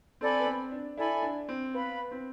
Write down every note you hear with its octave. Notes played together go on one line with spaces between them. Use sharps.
C4 A4 D5 G#5 B5
B3
C4
D4
E4 A4 D5 G#5 B5
D4
C4
B3 B4 F5 B5
C4